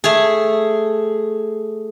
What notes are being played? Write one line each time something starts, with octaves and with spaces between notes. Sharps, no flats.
A3 G#4